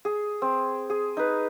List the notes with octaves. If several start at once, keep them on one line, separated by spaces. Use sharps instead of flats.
G#4
C4
G#4
D#4 B4